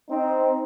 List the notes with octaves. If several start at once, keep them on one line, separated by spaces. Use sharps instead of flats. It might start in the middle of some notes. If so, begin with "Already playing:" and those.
C4 D#4